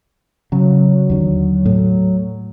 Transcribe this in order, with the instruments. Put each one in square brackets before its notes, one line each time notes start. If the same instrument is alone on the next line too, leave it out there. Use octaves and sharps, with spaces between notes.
[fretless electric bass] C#3 [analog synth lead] F#3
[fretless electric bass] D#2 D3
A2